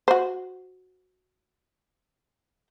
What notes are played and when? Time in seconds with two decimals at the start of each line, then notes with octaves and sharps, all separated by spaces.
0.08 F#4 C5